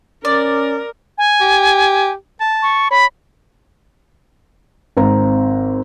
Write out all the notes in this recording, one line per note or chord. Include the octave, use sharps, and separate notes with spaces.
C#4 A#4 D5
G#5
G4
A5
C#6
C#5 B5
G#1 C4 A#5